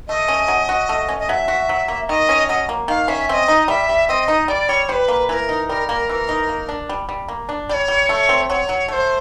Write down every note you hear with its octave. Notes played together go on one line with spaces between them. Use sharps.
A3 D#5
C#4
F#3
F#4
A3
C#4
D#5
F#3 E5
F#4
F#3
A#3
D#3 D#5
C#4
F#3 D#5
A#3
D#3 F5
C#4 E5
C4 D#5 E5
D#4
G3 E5
G3
C4 D#5
D#4
G3 D5
G3 C#5
G3 B4 C5
A#3
E3 A#4 B4
D#4
G3 A#4
A#3 A#4
E3
D#4
A#3
D4
G3
G3
A#3
D4
G3 C#5 D5
G3
A3
C4
F#3 C#5
F#3
A3 C5 C#5